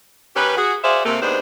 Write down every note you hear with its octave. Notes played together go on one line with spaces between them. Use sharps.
D#3 C#4 G4 B4
F#4 G#4
F#4 G#4 C5 D5 E5 F5
C3 A3 A#3
D#2 G#3 B3 D4 C5